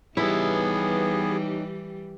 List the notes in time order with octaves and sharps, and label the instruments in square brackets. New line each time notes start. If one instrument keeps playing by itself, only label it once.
[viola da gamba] E3 G3 G4 [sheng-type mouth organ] B3 G#4 [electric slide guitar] D#4 C#5 [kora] E4